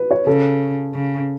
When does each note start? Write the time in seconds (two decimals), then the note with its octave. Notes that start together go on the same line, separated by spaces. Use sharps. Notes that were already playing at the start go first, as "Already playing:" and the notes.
Already playing: B4
0.11 C#5
0.27 C#3 A4
0.95 C#3